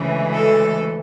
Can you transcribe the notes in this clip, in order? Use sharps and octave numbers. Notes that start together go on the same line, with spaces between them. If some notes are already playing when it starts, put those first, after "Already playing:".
Already playing: D2 C#3 E3 G#3
A4